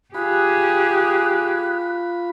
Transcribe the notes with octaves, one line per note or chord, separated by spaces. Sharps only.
F4 G4 G#4 B5 F#6